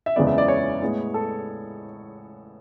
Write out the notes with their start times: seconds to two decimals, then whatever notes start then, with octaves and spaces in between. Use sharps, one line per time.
0.06 E5
0.16 F#1 E2 C#3 G#3 B3 D5
0.27 E5
0.38 D5
0.48 C#5
0.82 A2 G#3 B3
1.14 A4